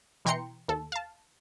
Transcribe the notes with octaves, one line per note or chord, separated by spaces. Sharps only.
B2 E3 G5 A#5 C6 C#7
D#2 A4
F5 A5